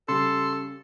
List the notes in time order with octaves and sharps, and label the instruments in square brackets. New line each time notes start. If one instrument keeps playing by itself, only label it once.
[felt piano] C#3 G3 [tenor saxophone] A4 [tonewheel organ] C6